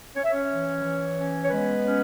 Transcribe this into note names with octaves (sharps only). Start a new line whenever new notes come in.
C#4 C#5
E5
C#4 C#5
E3
E3
C#4
C#5
G#3 B3 B4
C#4